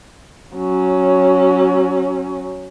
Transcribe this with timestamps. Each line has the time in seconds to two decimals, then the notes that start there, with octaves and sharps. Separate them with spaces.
0.56 F#3 C#4